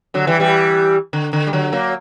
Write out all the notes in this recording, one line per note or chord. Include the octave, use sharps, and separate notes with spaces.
D3 F#3
E3 G3
E3 G3
D3
D3
G3
D3 F#3
F#3 A#3